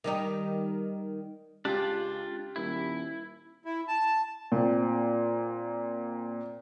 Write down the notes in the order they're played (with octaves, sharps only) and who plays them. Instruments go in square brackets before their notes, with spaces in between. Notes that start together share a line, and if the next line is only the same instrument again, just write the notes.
[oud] D#3 G3 D#4
[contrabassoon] C#2 [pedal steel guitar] D4 F4 [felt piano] G4
[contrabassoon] D#1 [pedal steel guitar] E4
[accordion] E4
A5
[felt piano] A#2 C4